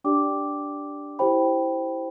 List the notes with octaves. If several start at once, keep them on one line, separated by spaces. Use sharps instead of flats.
D4 G4 D5 G5 D6
E4 G4 C5 G5 B5